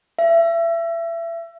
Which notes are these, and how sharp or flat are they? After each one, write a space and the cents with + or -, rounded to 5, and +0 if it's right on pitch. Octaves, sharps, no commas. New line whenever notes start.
E5 +30